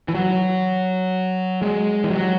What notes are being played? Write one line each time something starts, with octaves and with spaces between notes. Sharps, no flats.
E3
F#3
G#3
E3
F#3